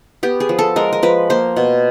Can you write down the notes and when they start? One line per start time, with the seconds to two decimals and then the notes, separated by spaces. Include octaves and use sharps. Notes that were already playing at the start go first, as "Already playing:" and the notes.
0.23 B3 G4
0.40 G#4
0.49 F3
0.59 A4
0.76 G#3 A#4
0.93 A#4
1.03 F3 B4
1.30 A#3 C5
1.56 B2